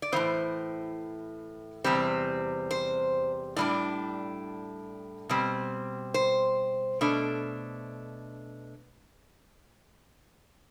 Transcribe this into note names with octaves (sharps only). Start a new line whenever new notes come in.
D5
A2 E3 B3 C5
E2 C3 G3 C4
C5
A2 G3 D4 D5
B2 G3 C4
C5
B2 A3 D4